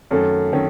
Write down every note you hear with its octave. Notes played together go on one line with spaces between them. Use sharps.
F#2 D#3 A3 C#4 A4
D#3 A3 C#4 A4